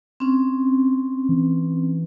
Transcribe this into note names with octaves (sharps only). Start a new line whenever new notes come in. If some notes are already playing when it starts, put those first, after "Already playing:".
C4 C#4
E3